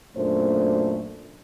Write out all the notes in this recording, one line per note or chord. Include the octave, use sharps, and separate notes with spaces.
F#2 A#2 A3 D4 C5